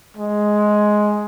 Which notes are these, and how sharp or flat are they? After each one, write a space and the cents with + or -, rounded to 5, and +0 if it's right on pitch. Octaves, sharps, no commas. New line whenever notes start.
G#3 +5